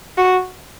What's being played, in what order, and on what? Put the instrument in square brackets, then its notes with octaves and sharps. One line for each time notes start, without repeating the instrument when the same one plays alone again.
[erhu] F#4